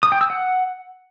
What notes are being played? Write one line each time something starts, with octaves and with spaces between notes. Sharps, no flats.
D#6
G5
E6
F#5